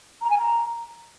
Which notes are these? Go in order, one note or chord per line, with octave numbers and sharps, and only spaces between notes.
A#5
G#5
A#5